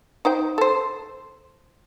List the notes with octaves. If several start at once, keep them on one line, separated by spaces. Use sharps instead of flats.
D#4 C5 G5
A4 C5